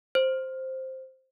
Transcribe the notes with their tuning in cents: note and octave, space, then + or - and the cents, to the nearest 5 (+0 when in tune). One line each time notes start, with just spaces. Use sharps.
C5 +5